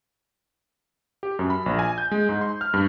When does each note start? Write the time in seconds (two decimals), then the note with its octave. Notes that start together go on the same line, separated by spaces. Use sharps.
1.23 G4
1.39 F#2
1.50 B5
1.66 A#1
1.79 G#5
1.98 G6
2.11 G#3
2.29 G#2
2.41 C6
2.61 F6
2.74 G2